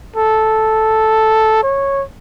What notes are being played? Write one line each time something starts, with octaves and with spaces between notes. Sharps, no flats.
A4
C#5